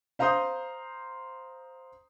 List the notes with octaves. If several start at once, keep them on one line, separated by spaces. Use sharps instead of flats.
C5 F5 A#5 C6 D#6 G6